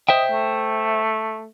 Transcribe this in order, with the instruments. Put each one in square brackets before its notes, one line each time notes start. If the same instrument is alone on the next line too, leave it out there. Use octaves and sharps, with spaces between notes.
[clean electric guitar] C5 E5 G5 [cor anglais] D#5
[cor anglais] A3